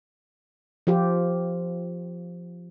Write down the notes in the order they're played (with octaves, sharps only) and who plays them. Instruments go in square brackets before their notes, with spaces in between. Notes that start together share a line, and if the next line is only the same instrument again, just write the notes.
[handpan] F3 F4 G4